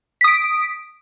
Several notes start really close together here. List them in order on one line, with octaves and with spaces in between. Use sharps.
B6 D#6 D7